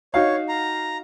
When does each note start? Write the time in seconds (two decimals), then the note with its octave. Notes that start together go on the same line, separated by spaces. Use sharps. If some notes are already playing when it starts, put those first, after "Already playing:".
0.14 D#4 F#4 C#5 F5
0.49 A#5